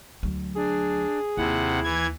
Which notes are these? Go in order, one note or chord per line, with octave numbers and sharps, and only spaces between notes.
D2 F#3
D4 G#4
D#2 C3 E4 F#5
E3 G#6